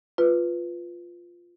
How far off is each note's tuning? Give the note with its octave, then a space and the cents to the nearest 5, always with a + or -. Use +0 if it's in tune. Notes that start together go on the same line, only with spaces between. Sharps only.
F4 +0 B4 +0